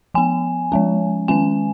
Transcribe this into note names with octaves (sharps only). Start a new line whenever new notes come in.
F3 B3 G#5
F3 G#3 C#4
D#3 G#3 C#4 G#5